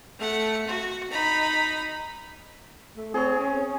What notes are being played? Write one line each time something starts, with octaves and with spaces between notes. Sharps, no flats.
A3 F#5
F#4
D#4 B5
A3
C4 G#4 C#5
C#4